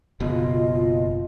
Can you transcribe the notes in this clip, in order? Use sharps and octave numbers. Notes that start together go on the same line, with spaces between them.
F#1 B2 F4 D#5